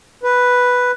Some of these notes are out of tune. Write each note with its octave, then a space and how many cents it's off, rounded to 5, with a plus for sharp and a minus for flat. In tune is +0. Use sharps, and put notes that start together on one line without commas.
B4 +0